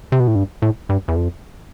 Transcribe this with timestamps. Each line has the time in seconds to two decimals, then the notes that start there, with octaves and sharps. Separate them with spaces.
0.12 C3
0.20 B2
0.28 A2
0.35 G2
0.62 A2
0.89 G2
1.08 E2
1.16 F2